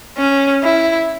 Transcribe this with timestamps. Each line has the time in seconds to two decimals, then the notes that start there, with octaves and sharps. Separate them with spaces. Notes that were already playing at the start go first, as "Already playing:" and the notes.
0.18 C#4
0.63 E4